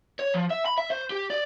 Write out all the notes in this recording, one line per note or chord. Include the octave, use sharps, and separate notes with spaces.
C#5
F3
E5
B5
E5
C5
G4
D5